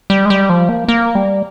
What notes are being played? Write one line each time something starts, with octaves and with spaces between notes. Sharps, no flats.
G3
G#3
G3
F3
A#3
A#3
G3